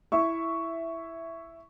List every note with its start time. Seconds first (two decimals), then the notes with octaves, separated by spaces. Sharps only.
0.12 E4 E5 C#6